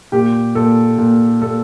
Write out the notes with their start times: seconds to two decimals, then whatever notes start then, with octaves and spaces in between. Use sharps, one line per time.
0.12 A#2 G4
0.55 A#2 A4
0.98 A#2
1.42 A#2 A4